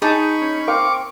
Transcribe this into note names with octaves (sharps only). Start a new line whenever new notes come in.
D#4 G#4 A5 B5 C#6
C#4
C4 A#4 F5 C#6 D6